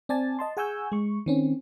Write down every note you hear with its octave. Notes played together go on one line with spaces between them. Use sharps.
C4 D5 G#5 A5 A6
D#5 A5 C6
G#4 F#5 G#5 C#6 E6 G6
G#3 C#6
D#3 C4 C#4